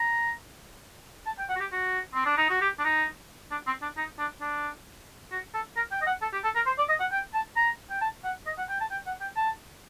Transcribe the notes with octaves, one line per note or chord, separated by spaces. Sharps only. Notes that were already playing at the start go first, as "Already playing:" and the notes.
Already playing: A#5
A5
G5
F#5
F#4
G4
F#4
C4
D4
D#4
F#4
G4
D4
D#4
D4
C4
D4
D#4
D4
D4
F#4
A4
A#4
G5
D#5
F#5
A4
G4
A4
A#4
C5
D5
D#5
F#5
G5
A5
A#5
G5
A5
F#5
D#5
F#5
G5
A5
G5
F#5
G5
A5